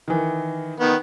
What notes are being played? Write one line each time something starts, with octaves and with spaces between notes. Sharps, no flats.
D#3 E3
D#3 B3